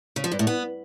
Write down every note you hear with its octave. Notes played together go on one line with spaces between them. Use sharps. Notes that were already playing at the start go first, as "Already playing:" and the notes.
C#3
F3
G2
A2
B3